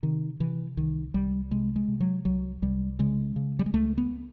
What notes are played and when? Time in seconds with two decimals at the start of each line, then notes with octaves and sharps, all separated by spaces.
0.03 C3 D#3
0.40 C3 E3
0.77 C2 D#3
1.14 C2 G3
1.51 C3 G#3
1.76 G#3
1.88 C3
2.00 F#3
2.25 C2 F#3
2.62 C2 G3
2.99 C#3 G#3
3.36 C#3
3.59 G3
3.66 G#3
3.73 C#2 A3
3.98 B3